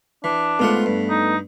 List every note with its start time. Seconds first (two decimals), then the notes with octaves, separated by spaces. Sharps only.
0.24 E3 D4
0.59 G#2 A3 B3 F4 F#5
0.86 G2
1.09 D#4